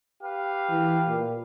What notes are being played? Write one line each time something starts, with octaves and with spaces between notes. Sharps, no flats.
G4 B4 F5
E3
A#2